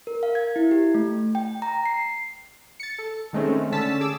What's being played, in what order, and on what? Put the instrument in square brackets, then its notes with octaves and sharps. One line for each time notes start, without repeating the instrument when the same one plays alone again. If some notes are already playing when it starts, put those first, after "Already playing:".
[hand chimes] A#4
F5
G#6
E4
G4
A3
G5
A#5
C7
[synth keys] A6 C#7
A4
D#3 G#3 A3 C4 C#4
D3 C#4 A5 E6 B6
G#4 D6 E6